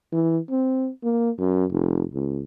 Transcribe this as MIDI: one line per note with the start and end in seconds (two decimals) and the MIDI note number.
0.12 0.38 52
0.50 0.90 60
1.04 1.30 58
1.38 1.65 42
1.71 2.03 29
2.14 2.43 37